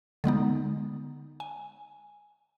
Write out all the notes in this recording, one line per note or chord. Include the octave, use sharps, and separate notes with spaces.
D3 G#3 B3 D#4
G#5